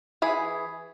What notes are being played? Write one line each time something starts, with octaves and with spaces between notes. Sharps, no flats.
E3 G#4 B5